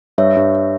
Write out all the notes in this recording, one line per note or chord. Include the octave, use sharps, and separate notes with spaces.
G2 C#5 E5
G2